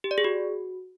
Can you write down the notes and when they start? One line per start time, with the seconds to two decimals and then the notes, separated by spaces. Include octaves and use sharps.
0.04 G4
0.11 D5
0.18 G#4
0.24 F#4